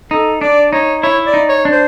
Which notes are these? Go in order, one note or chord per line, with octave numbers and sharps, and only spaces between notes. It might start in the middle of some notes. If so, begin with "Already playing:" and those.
D#4 A4
D4 D5
D#4 C#5
E4 C#5
D5
D#4
C#5
D4
C5